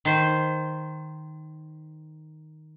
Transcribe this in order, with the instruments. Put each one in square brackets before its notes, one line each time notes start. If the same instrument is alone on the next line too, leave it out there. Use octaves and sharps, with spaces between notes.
[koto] D#3 C5